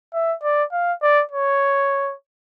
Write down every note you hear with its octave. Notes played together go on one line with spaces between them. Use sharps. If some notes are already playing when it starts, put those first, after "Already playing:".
E5
D5
F5
D5
C#5